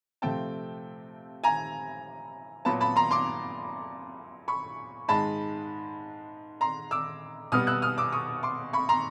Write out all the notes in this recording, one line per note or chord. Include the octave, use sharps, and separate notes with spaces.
C3 F3 A3 C4 G5 A5
G#5 A#5
A#2 F#3 B3 A5 B5
A5 B5
A#5 C6
C6 D6
B5 C#6
G#2 D#3 G#3 A5 B5
A#5 C6
D6 E6
B2 G3 B3 D#6 F6
E6 F#6
D#6 F6
D6 E6
C#6 D#6
C6 D6
B5 C#6
A#5 C6